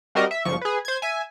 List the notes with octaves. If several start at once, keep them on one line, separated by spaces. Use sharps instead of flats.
G3 C4 F#4 G4 A#4 D#5
E5
G1 F3 C#6
G#4 B4
C5 G#6
E5 G#5